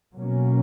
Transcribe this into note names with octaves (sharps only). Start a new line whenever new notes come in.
B2 F#3 A#3 C#4